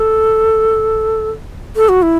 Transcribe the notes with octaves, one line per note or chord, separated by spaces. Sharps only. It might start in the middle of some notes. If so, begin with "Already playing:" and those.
Already playing: A4
A4
F#4
E4